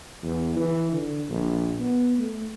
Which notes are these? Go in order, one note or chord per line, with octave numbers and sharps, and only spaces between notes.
E2
E3
D3
A#1
B3
A3